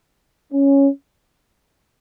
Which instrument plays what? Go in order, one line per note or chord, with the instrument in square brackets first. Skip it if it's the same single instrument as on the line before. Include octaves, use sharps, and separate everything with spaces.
[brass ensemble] C#4